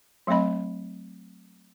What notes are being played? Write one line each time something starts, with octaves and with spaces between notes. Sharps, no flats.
F#3 A3 C4 D#5 B5